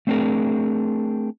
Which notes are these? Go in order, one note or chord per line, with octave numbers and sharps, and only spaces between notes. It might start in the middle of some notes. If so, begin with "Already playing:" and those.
A3 C4 D4 G#4 A#4